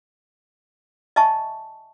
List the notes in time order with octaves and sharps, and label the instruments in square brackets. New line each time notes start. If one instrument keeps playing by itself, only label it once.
[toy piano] D#5 E5 G#5 A5 C#6